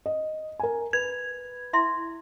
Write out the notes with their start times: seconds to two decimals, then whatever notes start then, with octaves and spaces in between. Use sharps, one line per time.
0.06 D#5
0.59 A#4 G#5
0.93 B4 G#6
1.73 E4 E5 C6